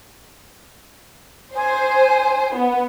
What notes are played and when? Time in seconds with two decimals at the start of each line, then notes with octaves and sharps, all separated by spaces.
1.55 C5 G#5
2.55 B3